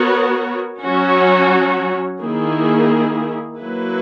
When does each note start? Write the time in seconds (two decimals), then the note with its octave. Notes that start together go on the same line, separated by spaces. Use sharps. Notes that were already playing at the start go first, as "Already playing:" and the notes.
Already playing: B3 F#4 A#4 C#5
0.83 F#3 C#4 F#4 C#5
2.21 D#3 A#3 E4 G#4
3.59 F#3 A#3 E4 B4